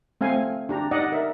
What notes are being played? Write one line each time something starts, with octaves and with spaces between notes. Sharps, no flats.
A3 C4 F5 G#5
D4 G4 A#5
D#4 D5 D#5 F#5
A#4 E5